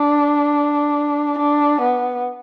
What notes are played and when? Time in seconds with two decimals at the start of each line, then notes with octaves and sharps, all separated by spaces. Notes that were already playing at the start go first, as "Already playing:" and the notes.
Already playing: D4
1.39 D4
1.81 B3